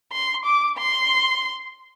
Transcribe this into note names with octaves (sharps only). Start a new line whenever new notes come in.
C6
D6
C6